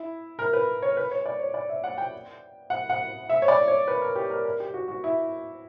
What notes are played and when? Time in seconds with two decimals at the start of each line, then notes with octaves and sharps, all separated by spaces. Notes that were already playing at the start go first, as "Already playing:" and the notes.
Already playing: E4
0.39 A#4
0.53 B4
0.82 C#5
0.97 B4
1.11 C#5
1.26 D5
1.39 C#5
1.54 D5
1.69 E5
1.84 F#5
1.98 G5
2.70 F#5
2.90 F#5
3.29 E5
3.42 C#5
3.48 D5
3.68 C#5
3.88 B4
4.01 A#4
4.15 G4
4.30 A#4
4.45 A#4
4.60 G4
4.74 F#4
4.88 F#4
5.04 E4